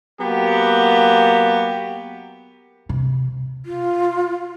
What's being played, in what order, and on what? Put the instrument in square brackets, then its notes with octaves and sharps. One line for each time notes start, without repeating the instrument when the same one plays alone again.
[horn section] F#3 A#3 B3 G4
[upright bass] C3
[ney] F4